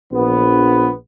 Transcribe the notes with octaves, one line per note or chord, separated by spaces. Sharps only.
A#1 B3